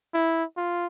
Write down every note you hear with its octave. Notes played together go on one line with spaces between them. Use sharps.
E4
F4